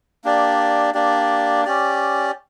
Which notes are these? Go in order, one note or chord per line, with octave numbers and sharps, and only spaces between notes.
A#3 D4 G4 D5
A#3 D4 G4 D5
C#4 G4 D5